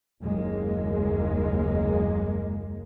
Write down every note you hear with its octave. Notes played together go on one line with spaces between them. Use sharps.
F#1 D#2 G#3 A#3